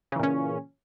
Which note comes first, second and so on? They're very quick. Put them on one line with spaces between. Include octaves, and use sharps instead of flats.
C#3 E3 A#2 C#4